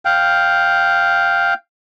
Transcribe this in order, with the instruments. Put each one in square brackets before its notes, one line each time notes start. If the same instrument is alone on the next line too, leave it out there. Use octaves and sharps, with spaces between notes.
[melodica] F5 G5